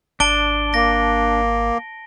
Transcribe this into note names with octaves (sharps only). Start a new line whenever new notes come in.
G#1 D4 A5 D7 G7
A#3 A#6